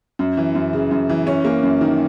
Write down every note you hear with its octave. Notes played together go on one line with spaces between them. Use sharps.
F#2
E3
F#2
C#3
F#2
E3
C#4
A#3
F#2
D#3